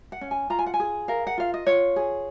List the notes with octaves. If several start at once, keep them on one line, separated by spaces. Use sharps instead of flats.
F#5
C#4
G#5
F4 A#5
G#5
F#5
G#5
G#4
A#4 F5
F#5
F4 F5
D#5
F4 C#5
G#4